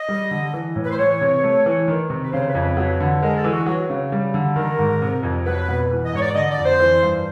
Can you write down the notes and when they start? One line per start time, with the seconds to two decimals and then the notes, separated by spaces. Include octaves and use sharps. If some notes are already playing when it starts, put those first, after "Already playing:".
Already playing: D#5
0.09 G3
0.31 D3
0.54 E3
0.76 A2
0.84 B4
0.91 C5
0.98 E3 C#5
1.21 C3
1.44 A3
1.66 E3
1.88 D#3
2.10 C3
2.23 B4
2.32 C#3 C5
2.48 B4
2.55 F2
2.62 B4
2.77 F#3
3.00 D3
3.23 G#3 A#4
3.37 A4
3.44 E3
3.52 F#4
3.66 F#3 F#4
3.90 C#3
4.12 G3
4.34 D3
4.56 D#3 A#4
4.79 G#2
5.02 C3
5.23 F2
5.46 F#3 B4
5.68 B2
5.91 E3
6.05 D#5
6.13 G#2 C#5
6.21 D5
6.35 D3 D#5
6.50 D5
6.58 F2
6.65 C5
6.80 E3
7.03 G2